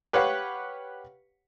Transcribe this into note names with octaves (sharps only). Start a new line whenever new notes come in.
G4 B4 C#5 F5 F#5